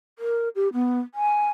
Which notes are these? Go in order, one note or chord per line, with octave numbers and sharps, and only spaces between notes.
A#4
G4
B3
G#5